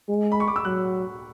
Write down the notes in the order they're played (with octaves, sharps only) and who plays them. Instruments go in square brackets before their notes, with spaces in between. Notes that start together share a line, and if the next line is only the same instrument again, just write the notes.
[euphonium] G#3
[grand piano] B5
C#6
D6
E6
[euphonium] F#3 [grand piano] F#6